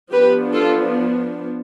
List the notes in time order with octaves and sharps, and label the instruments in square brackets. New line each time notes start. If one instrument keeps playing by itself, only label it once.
[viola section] F3 B3 D4 G4 B4
F4 A4